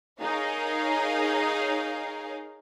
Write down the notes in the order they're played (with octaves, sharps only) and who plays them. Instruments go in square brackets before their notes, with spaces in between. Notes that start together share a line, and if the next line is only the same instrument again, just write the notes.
[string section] D#4 G#4 A#4 C#5 F5